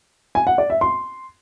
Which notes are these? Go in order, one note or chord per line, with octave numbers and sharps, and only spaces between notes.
G#5
F#5
D5
E5
C6